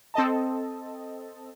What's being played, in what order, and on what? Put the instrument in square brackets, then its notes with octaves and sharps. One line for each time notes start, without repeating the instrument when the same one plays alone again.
[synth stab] C4 A4 D#5 A5